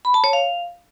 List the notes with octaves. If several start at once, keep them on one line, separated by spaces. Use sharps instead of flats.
B5
A5
C#5
F5